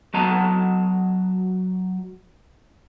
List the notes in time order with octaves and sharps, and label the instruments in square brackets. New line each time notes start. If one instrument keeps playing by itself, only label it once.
[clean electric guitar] F#3 F#4 D#5 A5 A#5